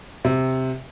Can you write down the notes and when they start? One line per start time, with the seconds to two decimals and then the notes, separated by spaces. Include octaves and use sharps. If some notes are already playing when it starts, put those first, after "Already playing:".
0.25 C3